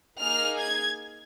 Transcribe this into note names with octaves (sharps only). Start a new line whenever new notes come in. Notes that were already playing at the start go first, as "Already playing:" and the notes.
A#3 D#4 G#4 F6
G#6